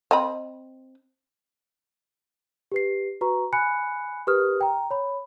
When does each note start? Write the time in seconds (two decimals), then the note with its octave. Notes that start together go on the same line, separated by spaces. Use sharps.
0.11 C4 D#5 B5
2.72 G4 B4 C7
3.21 F#4 B4 A#5 C#6
3.53 G#5 B5 F#6 C#7
4.27 G4 A#4 B4 D#6 F6
4.61 G5 A#5
4.91 C#5 B5